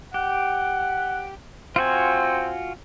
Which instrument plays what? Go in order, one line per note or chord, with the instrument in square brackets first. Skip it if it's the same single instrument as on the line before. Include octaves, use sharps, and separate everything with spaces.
[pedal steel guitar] G4 [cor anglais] F#5
[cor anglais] C4 [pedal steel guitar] F4 F#4 G#5